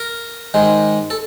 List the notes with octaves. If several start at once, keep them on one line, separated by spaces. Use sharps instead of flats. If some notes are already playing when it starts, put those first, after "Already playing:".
Already playing: A#4
G#2 D#3 G#3
A4